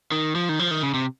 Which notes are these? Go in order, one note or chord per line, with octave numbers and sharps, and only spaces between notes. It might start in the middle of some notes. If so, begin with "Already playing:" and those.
D#3
F3
D#3
F3
D#3
C#3
C3